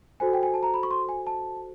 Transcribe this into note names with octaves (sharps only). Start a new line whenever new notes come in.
F#4 A4 C5 G#5
G5
G#5
A5
A#5
B5
C#6
C6
G#5
A5